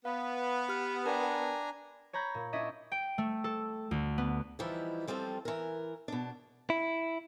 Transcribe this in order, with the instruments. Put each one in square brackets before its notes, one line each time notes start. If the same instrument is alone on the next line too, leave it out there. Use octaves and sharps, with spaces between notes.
[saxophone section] B3 [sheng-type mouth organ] B4 [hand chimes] F5
[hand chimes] G4 F6
[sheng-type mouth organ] D4 G#5 A#5 [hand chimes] A#4 G5
[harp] C#5 A#5 B5 G6
A#2
C#4 D4 E4 D#5 E5
G5
A3
A4
D2
B3
[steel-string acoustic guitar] E3 F3 G3 D#4 E4
F3 G3 C4 F4 A4
E3 A#4
B2 D4
[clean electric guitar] E4